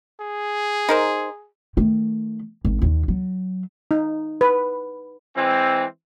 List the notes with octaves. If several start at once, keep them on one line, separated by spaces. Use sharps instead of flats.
G#4
D#4 A#4 C5
D#3 A3
G#1
D#2 D#3
F#3
D#4
B4
E3 G#3 C4